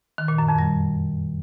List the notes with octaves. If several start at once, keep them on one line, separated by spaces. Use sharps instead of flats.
D#3
A#2
F#2
F2
G3